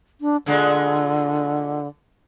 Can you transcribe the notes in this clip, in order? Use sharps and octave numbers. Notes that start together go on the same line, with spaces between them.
D4
A#2 D3 G#3 A3